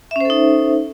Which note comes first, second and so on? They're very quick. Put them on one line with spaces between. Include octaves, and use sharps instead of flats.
E5 C#4 C5 A4 D#4